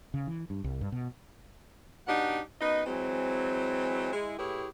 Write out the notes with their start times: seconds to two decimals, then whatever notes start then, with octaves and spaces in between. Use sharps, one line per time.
0.14 C#3
0.27 E3
0.50 G2
0.64 C2
0.81 G2
0.92 B2
2.07 B2 D4 D#4 G4 F#5
2.60 F#2 B3 D#4 B4 D#5
2.86 E3 F#3 G#3 C4
4.13 G#3 E4
4.38 A2 E4 G4 G#4 B4 C#5